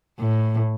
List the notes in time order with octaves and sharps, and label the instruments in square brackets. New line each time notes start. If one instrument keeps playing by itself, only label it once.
[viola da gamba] A2